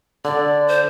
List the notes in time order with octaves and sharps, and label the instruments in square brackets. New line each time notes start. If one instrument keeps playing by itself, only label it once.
[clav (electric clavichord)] D3 [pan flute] D5
[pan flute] C5